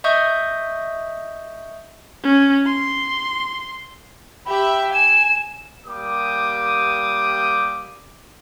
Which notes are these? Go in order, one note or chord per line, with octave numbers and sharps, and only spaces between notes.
D#5 E5 C#6 D#6 G6
C#4
C6
G4 E5 B5
G#5 E7
G3 A#3 G4 D6 D#6